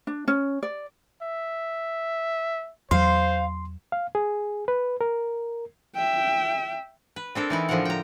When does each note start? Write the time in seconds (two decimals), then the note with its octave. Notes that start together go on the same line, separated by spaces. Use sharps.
0.07 D4
0.28 C#4
0.63 D5
1.22 E5
2.91 E2 F#3 C5 F5 C6
3.92 F5
4.15 G#4
4.68 B4
5.01 A#4
5.95 E5 G5
7.16 B4
7.35 C4 D4 A4 A#4
7.50 E3 D#4 E4
7.69 A2 D3 F3 F#3 A#4 F#5
7.85 G5 A#5